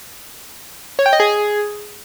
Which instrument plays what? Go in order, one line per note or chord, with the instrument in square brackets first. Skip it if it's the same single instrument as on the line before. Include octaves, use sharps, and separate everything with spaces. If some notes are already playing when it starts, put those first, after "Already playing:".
[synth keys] C#5
G5
D#5
G#4